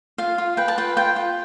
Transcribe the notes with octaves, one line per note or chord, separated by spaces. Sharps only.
F4 F5
F4
B4 G5
A5
F4 G5
F4 G5
F4